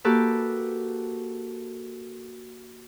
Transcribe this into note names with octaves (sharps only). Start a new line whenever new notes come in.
A#3 F#4 G4 A4 B4